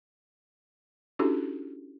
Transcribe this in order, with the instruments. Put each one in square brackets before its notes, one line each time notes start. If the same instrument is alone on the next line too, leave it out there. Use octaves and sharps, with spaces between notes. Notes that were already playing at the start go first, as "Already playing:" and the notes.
[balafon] C#4 D4 E4 F#4 G4 A4